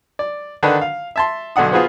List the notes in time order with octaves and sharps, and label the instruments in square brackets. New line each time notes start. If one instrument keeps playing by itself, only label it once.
[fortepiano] D5
D3 D#3 D4 B4
F5
E5 A5 C6
B1 D3 D4 F#5 D#6
B3 F4 F#4 G#4 B4 C5